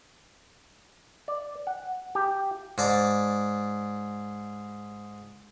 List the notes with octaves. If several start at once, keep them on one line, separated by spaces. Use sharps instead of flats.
D5
F#5
G4
G#2 D5 A5